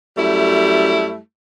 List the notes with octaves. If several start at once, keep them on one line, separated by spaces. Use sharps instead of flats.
F#2 G3 A3 E4